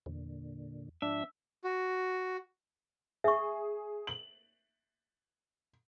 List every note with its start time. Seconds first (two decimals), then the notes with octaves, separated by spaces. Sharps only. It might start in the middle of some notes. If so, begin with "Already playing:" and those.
0.06 E2 A#2 D3
1.02 G#2 F3 D4 E5
1.64 F#4
3.24 G#4 E5 C#6
4.07 F#7